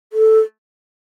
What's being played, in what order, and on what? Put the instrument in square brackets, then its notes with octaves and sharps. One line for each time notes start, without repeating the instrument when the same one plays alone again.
[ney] A4